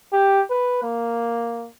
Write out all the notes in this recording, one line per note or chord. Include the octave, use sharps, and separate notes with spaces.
G4
B4
A#3